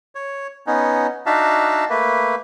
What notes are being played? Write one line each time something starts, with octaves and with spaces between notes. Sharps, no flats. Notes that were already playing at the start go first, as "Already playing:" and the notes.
C#5
B3 C#4 D#4
D4 D#4 F#4 E5 F5 A5
A3 A#3 B4